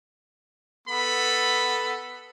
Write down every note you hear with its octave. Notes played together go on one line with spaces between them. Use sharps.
B3 A4 B5